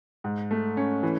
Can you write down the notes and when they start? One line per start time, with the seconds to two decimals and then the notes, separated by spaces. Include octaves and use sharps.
0.24 G#2
0.51 A3
0.77 C#4
1.03 E3